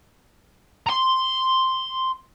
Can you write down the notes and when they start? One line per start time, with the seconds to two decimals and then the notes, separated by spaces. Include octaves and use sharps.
0.87 A#5 C6